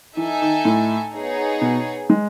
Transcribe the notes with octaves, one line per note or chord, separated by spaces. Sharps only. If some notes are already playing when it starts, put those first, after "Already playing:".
E3 D#4 A4 E5 G#5
D#3
A2
B3 D#4 G#4 C#5
B2
G#3